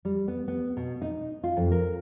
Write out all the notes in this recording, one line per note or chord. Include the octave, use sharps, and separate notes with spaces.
G3
B3
B3
B2
D#4
F4
F2
A#4